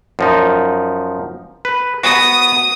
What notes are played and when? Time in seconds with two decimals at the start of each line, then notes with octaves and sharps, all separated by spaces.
0.19 F#2 F3 D#4
1.65 B4
2.03 B3 F#4 D#6